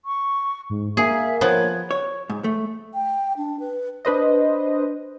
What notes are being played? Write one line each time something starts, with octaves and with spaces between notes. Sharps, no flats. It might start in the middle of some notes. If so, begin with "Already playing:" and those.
C#6
G#2
A#3 G#4 E5
F3 B3 C#5
C#5
G#2
A3
G5
D4
B4
D4 B4 C5 D#5